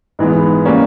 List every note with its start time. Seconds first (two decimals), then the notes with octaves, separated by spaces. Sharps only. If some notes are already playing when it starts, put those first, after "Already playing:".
0.19 G#2 E3 G#3 B3
0.65 G3 A#3 C#4